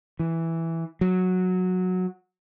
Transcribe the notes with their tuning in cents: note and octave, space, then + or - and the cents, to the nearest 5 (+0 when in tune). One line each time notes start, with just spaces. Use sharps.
E3 +0
F#3 -10